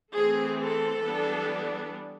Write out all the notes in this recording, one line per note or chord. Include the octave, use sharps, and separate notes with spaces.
E3 A3 C4 G#4
A4
E3 G3 B3 D4